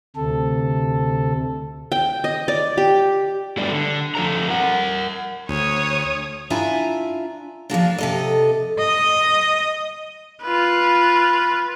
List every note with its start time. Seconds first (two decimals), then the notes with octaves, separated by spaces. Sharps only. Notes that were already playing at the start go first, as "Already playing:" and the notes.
0.16 D2 C3 A4
1.92 G5
2.24 D#5
2.48 D5
2.77 G4
3.57 F#3 G3 A3 B3 D4 D5
3.70 D3
4.15 F3 A4 A#5
4.49 A#4 F#5
5.49 D2 C#5 D#6
6.50 D4 E4 F4 E5 G#5 A#5
7.70 F3 G#3 A#3 D4
7.98 C3 A4 D#5
8.78 D#5
10.43 F4 B4